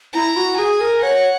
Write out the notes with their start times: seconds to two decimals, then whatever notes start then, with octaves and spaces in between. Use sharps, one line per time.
0.14 E4 A#5
0.37 F#4
0.58 G#4 G#5
0.81 A#4
1.02 C#5 F#5